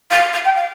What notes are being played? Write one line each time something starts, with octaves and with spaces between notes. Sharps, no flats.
F5
F5
G5
F5